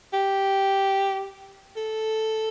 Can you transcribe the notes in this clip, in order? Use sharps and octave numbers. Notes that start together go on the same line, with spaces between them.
G4
A4